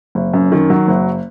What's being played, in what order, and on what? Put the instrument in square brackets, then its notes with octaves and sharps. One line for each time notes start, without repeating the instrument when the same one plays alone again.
[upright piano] F#1
F#2
D#3
F#3
F#1